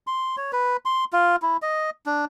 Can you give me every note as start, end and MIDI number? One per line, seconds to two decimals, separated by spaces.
0.07 0.36 84
0.37 0.51 73
0.52 0.77 71
0.85 1.05 84
1.13 1.36 65
1.42 1.57 64
1.62 1.90 75
2.06 2.25 62